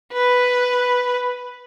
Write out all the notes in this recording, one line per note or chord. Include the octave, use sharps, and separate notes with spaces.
B4